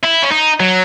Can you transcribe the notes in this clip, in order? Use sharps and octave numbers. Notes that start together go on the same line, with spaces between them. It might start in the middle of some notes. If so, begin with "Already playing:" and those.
E4
C#4
D#4
F#3